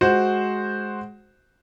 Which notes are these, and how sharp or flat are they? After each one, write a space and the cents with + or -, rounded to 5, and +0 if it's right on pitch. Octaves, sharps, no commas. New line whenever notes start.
G#3 +15 F#4 +0 C5 +0